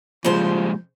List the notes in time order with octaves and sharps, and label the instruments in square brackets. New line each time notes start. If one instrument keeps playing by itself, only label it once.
[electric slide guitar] A#2 G3 G#3 [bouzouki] C#3 C5 [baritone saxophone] F3